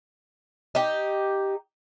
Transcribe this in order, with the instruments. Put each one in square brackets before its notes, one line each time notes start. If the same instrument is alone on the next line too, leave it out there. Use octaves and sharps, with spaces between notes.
[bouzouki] D#4 G4